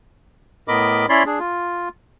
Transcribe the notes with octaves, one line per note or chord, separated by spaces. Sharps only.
A2 B3 A#4 D#5 B5 D6
C#4 E4 C#5 D5 B5 C6
D4 G#4
F4